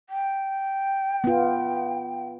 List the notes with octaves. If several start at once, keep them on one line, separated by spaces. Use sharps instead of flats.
G5
B3 F4